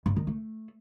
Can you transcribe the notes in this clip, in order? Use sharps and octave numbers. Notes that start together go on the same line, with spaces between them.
G2
D#3
A3